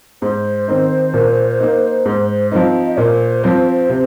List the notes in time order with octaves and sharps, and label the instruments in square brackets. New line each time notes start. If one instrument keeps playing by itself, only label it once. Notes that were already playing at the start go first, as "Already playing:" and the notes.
[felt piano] G#2 [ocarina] C5
[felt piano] D#3 C4 D#4
A#2
A#3 D#4
G#2
F3 C4 D#4
[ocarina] D#5
[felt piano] A#2 [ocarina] C5
[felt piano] F3 C4
C3